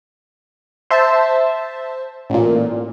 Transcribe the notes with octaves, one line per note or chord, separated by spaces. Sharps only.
C5 E5 A5
A1 A#2